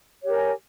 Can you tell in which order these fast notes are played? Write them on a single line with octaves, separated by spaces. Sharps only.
C#5 G4 A#4 G#5